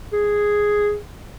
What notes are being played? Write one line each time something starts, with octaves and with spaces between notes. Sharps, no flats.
G#4